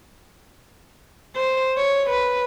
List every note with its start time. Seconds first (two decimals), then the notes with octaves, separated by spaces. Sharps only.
1.36 C5
1.77 C#5
2.10 B4